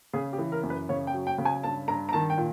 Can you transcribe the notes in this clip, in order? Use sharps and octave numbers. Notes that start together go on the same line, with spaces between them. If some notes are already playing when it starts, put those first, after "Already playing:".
C#3 G#4
G4
E3
A#4
F#2
B4
C#3 C#5
G5
F#3
G5
C#3
G#5
G2 A5
G2 A#5
A#5
D#3 A5
G5
A#2